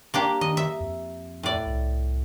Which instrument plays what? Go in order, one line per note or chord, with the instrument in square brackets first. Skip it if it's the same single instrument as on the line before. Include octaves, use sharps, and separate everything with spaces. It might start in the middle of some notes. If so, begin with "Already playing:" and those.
[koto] A#3 D4 G4
[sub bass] D#3 [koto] D#5
[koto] E5
[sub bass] F2
[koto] A2 D5
[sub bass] C2